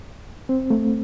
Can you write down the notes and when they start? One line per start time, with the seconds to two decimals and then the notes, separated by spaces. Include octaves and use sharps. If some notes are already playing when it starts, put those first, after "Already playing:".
0.49 C4
0.70 A3